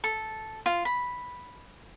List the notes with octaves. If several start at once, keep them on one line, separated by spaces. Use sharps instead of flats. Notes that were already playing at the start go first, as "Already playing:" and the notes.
A4
F4
B5